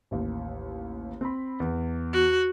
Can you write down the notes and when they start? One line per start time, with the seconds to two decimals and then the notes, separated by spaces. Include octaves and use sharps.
0.11 A1 D#2
1.21 C4 B5
1.60 E2
2.13 F#4